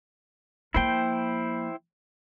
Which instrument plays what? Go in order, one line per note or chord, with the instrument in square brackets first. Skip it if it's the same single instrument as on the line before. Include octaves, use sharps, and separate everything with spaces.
[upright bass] F3 A#3 [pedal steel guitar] E4 C5 G5